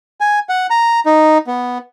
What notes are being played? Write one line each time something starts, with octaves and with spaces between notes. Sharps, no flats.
G#5
F#5
A#5
D#4
B3